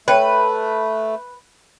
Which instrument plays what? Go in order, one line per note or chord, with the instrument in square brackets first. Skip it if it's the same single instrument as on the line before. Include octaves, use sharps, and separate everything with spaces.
[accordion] A3 [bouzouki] B4 [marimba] C#5 G5 F#6